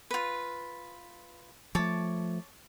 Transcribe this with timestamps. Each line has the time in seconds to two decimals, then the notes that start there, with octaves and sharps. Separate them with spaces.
0.11 F4 B4
1.75 F3 A3 C#5 A5 D6